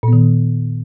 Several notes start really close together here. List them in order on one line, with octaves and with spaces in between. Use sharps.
A#2 B3 D#3